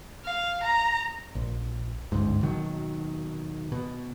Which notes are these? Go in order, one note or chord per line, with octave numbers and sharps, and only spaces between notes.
F5
A#5
A#1
G1 C#2 G#2
D#2 B2 D#3 F#3
B2